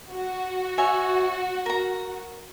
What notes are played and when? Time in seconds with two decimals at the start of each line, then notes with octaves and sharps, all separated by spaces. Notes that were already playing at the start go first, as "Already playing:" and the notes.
0.11 F#4
0.78 C#5 E5 G#5
1.66 A#4 A#5